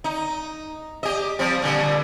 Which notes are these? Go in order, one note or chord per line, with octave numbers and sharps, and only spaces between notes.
D#4
G4 D#5
F3 G3 C4
A#2 D3 G3